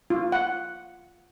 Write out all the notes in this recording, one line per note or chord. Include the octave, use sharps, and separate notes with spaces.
F4
F#5